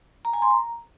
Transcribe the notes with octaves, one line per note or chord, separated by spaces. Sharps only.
A#5
G#5
C6
A#5